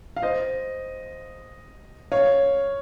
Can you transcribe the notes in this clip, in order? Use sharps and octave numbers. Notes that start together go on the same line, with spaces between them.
F5
C5 D#5
C#5 F5